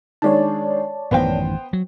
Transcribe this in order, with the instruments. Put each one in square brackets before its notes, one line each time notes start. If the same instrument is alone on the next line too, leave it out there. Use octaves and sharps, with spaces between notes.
[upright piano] D#3 G#3 D4 [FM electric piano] C#5 D5 A5
[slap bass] A1 F#2 D#3 [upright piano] B3 C5 G5
[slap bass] F#3